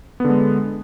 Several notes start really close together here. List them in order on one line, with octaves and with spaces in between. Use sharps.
B3 D3 G#3